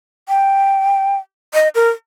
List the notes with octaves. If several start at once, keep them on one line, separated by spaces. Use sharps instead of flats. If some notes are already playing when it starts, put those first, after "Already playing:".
G5
D#5
A#4